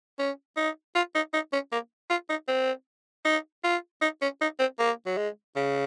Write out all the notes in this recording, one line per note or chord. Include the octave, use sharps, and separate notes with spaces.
C#4
D#4
F4
D#4
D#4
C#4
A#3
F4
D#4
C4
D#4
F4
D#4
C#4
D#4
C4
A#3
F#3
G#3
C#3